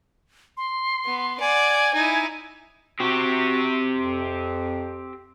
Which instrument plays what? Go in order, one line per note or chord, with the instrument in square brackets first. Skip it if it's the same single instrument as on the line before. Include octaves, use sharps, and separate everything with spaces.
[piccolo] C6
[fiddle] B3
[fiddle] D5 F#5 [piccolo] G#5
[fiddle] D#4 E4
[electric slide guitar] C4 G4 [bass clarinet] F#4
[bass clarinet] F2